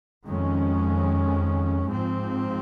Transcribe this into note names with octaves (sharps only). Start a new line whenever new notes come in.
F2 D#3 G#3 C#4
G#2 F3 C4